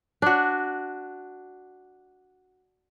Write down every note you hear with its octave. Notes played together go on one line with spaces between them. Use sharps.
D4 F#4